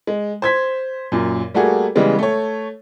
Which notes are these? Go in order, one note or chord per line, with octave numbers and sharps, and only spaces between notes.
G#3
C5 G#6 B6
F#2 A#2
G3 A3 A#3 F#4 G#4
C#3 E3 G3 G#3 B3
A3 C#5